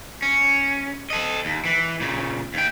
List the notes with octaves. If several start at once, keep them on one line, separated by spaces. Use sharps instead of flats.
C#4
A4 D#5
D#2
E3
A#2 C#3
D#2 G5